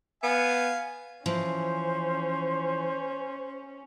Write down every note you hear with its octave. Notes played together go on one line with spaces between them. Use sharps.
B3 F5 G#5
E3 F3 C#4 C5